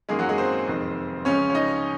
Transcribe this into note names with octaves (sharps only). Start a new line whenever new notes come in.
F#2 D#3 G#3 A#3 G#4
F#3 F#4
G#3 G#4
C4 C5
F1 F2 D#3 G#3
C#2 C#3 F3 G#3 C#4 C#5
C#5
D#4 D#5